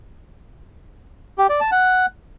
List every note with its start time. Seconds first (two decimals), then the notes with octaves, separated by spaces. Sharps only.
1.38 G4
1.49 D5
1.60 A5
1.71 F#5